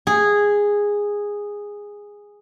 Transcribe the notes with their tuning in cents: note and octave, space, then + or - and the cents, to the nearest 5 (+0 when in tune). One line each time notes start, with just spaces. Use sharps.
G#4 -10